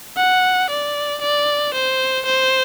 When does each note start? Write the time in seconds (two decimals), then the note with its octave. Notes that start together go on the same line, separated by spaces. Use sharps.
0.17 F#5
0.70 D5
1.22 D5
1.75 C5
2.26 C5